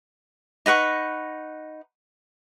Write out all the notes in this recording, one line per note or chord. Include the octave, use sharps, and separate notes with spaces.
D#4 B4 F#5 C#6